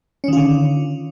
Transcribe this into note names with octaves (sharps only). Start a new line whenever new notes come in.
D3 D#3 C#4 F4